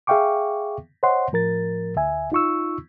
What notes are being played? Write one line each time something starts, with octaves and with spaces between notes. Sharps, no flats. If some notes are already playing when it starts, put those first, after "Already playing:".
G#4 E5 F5 G5 C#6 D6
C5 C#5 D#5 F#5 C6
A2 F3 A#4 A6
D2 E5 G#5
D#4 F4 C#6 E6